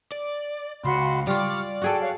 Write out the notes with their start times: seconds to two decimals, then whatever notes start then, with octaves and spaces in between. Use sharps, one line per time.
0.12 D5
0.84 C#2 F#4 B5 C6
1.27 G3 F4 D5 C#6 D6 F6
1.82 F#4 G#4 A4 F#5 G5
1.99 C#5 F5 F#5